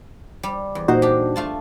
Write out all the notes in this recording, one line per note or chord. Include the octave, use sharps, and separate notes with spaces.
G3
E2
A#2 D#4 F#4 C5
D4 G4
A3 F4 A5